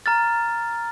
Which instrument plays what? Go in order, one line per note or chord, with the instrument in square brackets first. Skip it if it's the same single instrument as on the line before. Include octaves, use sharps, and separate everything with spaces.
[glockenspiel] A#5 F6 A6